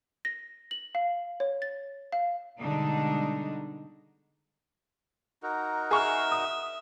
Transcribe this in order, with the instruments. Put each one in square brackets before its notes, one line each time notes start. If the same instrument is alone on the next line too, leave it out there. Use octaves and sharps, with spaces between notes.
[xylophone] A#6
F#7
F5
C#5
A6
F5
[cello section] B2 D3 G3 G#3 D4 D#4
[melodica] D#4 F#4 A#4
[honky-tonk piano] G#4 C#6 F6 [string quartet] E5
[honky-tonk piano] D#6